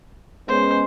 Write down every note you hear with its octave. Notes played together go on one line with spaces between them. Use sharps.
G#3 B3 C#4 C5